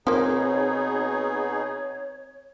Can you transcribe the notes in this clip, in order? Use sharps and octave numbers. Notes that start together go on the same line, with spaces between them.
B2 F3 A#3 C4 D#4 G#4 C#5